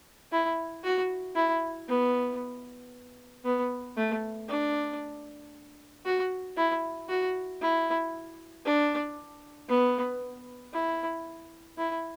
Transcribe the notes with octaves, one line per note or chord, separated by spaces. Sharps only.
E4
F#4
E4
B3
B3
A3
D4
F#4
E4
F#4
E4
D4
B3
E4
E4